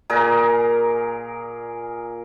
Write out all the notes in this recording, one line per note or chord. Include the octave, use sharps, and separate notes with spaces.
A#2 G#4 A#4 A#5